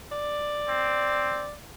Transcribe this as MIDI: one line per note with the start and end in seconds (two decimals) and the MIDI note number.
0.12 1.53 74
0.68 1.47 60